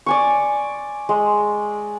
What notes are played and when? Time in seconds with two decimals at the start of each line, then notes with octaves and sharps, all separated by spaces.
0.06 D5 G#5 C#6
1.09 G#3